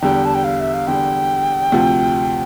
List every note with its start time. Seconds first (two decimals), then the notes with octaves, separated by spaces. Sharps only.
0.01 E2 D3 G3 G5
0.25 A5
0.35 G5
0.44 F5
0.60 E5
0.74 F5
0.87 E2 D3 G3 G5
1.72 D2 C3 F3